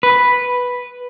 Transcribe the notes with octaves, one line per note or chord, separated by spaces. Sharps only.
B4